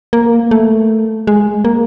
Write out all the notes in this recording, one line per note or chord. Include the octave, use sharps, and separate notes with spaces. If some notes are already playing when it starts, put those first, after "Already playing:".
A#3
A3
G#3
A#3